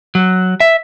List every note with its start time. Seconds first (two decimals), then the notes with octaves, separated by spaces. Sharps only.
0.15 F#3
0.60 E5